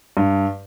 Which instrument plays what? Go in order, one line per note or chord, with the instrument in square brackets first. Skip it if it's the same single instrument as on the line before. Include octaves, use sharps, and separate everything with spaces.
[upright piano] G2